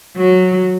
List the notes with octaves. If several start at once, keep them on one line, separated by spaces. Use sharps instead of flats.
F#3